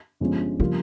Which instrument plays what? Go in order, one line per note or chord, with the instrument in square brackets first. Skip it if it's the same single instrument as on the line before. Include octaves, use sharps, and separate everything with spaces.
[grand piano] G1 G2 F3 G#3 C#4
[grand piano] C#3 G3 A#3 F4 [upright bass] F3